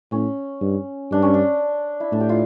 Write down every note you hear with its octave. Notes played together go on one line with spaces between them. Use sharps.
A2 C#4
G2
G2 D4
C#4
D4
E4
A2 D4
G4
F4